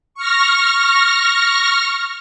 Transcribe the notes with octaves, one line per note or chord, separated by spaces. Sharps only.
C#6 F6 A#6